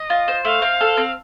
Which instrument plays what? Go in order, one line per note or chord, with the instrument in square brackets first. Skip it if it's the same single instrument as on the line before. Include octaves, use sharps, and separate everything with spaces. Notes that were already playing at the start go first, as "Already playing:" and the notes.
Already playing: [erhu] D#5
[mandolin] F4
C5
[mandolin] A3 [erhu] F5
[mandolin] C4
A4
C4